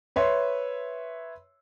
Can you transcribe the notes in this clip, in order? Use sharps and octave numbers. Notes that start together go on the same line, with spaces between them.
B4 C#5 E5 C6